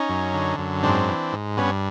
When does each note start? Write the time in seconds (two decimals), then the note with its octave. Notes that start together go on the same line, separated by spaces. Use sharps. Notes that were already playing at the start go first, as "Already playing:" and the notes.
Already playing: C#4 D#4
0.09 F#2
0.34 D3
0.58 F#2
0.83 G#2 C4 D4
1.08 E3
1.32 G#2
1.57 G2 B3 C#4